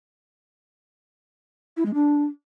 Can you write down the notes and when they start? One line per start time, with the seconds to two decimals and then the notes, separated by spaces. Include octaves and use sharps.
1.77 E4
1.85 G#3
1.94 D4